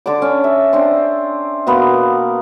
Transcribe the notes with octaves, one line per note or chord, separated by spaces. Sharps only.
D3 D4 A5 D6
C#4
E5
C4 D4
B2 A#3 B3 B4